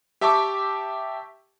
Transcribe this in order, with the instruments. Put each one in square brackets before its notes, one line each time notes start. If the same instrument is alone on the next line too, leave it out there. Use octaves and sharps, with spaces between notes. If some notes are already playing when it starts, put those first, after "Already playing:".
[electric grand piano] G4 E5 G5 A5 C#6 D6